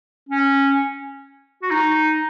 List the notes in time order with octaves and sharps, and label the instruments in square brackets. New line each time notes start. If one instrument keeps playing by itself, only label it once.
[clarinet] C#4
F#4
D#4